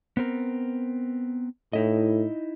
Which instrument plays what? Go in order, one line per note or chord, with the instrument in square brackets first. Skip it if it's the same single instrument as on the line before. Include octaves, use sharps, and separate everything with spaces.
[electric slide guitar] B3 C4 A#4
[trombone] A2 [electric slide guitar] D#4 E4 D#5